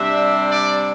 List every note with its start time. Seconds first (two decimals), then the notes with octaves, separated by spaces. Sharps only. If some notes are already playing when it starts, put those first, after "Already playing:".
Already playing: C3 G3 D4 E5
0.51 D5